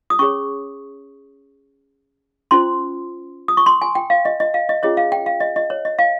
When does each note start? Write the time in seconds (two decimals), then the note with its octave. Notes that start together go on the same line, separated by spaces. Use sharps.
0.10 D#6
0.19 C#4 G#4 C#5 C#6
2.51 C#4 F4 C5 C6
3.48 D#6
3.57 C#6
3.66 C6
3.82 G#5
3.95 G5
4.10 F5
4.25 D#5
4.40 D#5
4.54 F5
4.69 D#5
4.83 C#4 F4 G#4 C#5 D#5
4.97 F5
5.12 G5
5.26 F5
5.40 D#5
5.56 D#5
5.70 C#5
5.85 D#5
5.99 F5